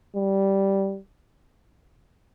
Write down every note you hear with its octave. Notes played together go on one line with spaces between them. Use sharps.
G3